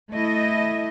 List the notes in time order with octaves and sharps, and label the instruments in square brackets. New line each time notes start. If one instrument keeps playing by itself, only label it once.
[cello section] A3 E4 D#5